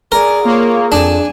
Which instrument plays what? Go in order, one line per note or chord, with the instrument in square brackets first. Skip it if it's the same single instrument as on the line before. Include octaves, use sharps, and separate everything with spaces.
[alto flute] G#4 [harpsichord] A#4 [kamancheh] D5 G#5
[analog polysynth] A#3 [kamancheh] F4 C#5
[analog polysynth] F2 E7 [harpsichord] D4 [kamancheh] G#5